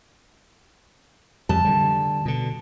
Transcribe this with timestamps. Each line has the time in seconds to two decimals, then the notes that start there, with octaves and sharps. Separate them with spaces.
1.49 F2 C#3 G3 A5
1.65 D3 G3
2.25 B2 D3